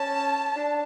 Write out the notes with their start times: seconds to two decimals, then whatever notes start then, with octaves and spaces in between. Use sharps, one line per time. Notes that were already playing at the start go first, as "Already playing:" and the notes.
Already playing: C#4 A5
0.56 D4